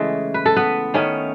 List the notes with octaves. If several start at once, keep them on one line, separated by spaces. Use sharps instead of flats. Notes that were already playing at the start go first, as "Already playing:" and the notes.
Already playing: C#3 E3 G#3 A3 A4
B4
A4
B3 B4
D#3 A3 C#4 C#5